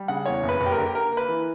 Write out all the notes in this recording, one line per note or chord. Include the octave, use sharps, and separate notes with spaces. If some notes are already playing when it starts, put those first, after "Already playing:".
Already playing: G3
C#3 F#5
E2 C#5
F#1
B4
F#1
G4
A#4
D3
G4
A#3 A#4
A#3 B4
E3